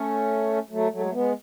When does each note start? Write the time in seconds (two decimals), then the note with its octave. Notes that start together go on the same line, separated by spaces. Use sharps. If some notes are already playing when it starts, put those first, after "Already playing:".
Already playing: A3 C#4
0.70 F#3 A3
0.91 F#3 A3
0.99 G#3
1.06 A3
1.13 G#3 B3